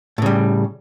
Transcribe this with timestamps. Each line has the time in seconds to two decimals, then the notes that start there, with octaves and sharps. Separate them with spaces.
0.18 A2
0.22 C#3
0.26 G3